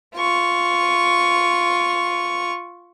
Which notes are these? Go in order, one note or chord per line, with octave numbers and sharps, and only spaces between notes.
F4 C#6